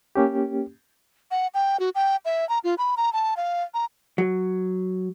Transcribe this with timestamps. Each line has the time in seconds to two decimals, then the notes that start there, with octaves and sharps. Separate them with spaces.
0.15 A#3 C#4 G4
1.31 F#5
1.54 G5
1.80 F#4
1.95 G5
2.25 E5
2.49 A#5
2.64 F4
2.78 B5
2.97 A#5
3.13 A5
3.37 F5
3.74 A#5
4.18 F#3